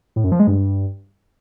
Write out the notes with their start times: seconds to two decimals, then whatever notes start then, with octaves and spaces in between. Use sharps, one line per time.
0.16 A2
0.24 F#2
0.32 F3
0.40 G#3
0.47 G2